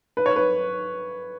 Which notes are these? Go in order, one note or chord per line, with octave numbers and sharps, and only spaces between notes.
B4
C#5
B4